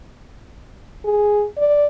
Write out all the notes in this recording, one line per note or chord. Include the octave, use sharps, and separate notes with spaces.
G#4
D5